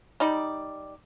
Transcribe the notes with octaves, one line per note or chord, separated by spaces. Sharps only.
G3 D#4 D5